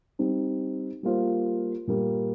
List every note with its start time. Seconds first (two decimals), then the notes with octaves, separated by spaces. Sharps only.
0.19 G3 C4 D#4
1.03 G3 A#3 F4 C5
1.87 A#2 G3 A#3